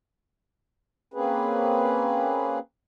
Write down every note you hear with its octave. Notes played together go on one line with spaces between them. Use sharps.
A#3 C4 C#4 G#4 B4